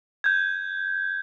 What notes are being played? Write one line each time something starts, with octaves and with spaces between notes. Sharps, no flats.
G6 G#6